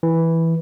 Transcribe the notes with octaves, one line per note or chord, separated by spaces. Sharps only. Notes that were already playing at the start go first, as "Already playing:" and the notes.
E3